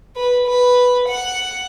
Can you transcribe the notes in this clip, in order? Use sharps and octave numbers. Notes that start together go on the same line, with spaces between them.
B4
B4
F#5